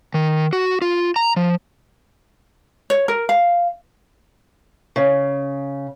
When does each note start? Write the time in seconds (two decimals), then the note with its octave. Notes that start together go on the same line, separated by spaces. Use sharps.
0.14 D#3
0.53 F#4
0.82 F4
1.16 A#5
1.36 F3
2.90 C#5
3.08 A#4
3.29 F5
4.96 C#3